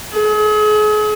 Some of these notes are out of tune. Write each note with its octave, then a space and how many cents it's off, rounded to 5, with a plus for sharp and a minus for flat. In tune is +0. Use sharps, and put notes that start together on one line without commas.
G#4 +40